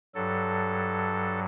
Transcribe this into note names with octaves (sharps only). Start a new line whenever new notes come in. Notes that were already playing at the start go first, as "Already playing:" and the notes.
G2 F#3 A4